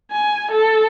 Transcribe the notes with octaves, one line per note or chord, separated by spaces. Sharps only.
G#5
A4